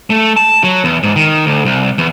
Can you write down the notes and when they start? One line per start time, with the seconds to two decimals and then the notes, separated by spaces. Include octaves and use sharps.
0.10 A3
0.36 A5
0.63 F#3
0.84 E2
1.03 G#2
1.16 D#3
1.46 D2
1.65 C2
1.98 E2